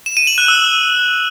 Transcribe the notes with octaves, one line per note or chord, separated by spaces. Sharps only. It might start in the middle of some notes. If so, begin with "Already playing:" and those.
E7
D#7
F#7
F#6
E6